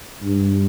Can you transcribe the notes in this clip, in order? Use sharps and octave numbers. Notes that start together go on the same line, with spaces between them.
G2